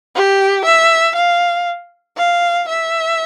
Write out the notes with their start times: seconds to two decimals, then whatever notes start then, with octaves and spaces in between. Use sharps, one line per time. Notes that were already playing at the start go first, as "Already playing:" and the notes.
0.15 G4
0.65 E5
1.16 F5
2.17 F5
2.68 E5